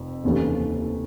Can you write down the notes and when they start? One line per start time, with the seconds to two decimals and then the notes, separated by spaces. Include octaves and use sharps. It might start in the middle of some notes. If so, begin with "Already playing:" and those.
Already playing: F1 F2
0.24 F1 D#2 C#3 E3 A3